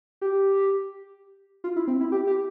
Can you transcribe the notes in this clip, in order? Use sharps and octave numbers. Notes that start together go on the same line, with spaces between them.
G4
F4
E4
C4
E4
G4
G4